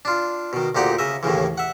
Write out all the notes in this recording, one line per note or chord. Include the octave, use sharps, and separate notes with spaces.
D4 F4
B2 D#3
D2 A#2 D#4 G4 F#5
C#3 D#5 E5
D#2 A2 C#3 E3
E5 F#5